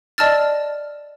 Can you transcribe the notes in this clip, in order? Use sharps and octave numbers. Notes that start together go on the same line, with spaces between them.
D5 D#5 A5 E6 F6 A6